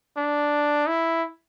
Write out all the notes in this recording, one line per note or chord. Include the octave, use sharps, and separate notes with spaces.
D4
E4